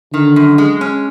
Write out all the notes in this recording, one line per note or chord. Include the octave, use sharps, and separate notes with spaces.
D3 D#3
F#2
G#3
C#4